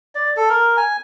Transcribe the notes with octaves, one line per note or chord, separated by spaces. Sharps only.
D5
A4
A#4
G#5